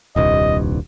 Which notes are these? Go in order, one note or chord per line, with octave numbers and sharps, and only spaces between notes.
D#1 C2 G2 D#5